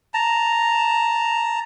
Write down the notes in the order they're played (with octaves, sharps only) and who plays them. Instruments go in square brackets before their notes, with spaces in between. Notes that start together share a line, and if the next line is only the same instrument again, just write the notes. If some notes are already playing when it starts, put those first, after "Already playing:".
[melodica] A5 A#5